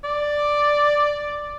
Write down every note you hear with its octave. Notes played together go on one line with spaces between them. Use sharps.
D5